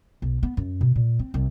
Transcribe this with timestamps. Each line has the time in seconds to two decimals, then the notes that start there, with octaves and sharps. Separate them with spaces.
0.22 B1
0.43 B3
0.57 F#2
0.81 B2
0.96 A#2
1.19 C4
1.34 C2